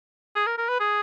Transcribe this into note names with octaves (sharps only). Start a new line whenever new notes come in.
G#4
A#4
A#4
B4
G#4